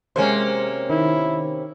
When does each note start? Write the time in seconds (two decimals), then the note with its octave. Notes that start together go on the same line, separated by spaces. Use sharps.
0.16 C3 G#3 A#3 C#4 C5
0.90 D#3 E4